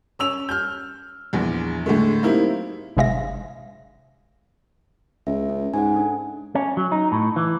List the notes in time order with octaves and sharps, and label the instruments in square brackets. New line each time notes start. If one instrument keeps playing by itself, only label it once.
[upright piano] C#4 E6 F7
F6 G6
A#1 E2
A2 D3 G#3 A3
F#3 A#3 C4 D#4 E4 G4
[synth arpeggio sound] G1 C3 G#3 E5 F5 A#6
[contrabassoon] C#2 [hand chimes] E5
[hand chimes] C#4
[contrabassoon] G#2 [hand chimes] F#5 G#5
[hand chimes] D4 A4
[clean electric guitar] C#4
F#3
D#4
A2
E3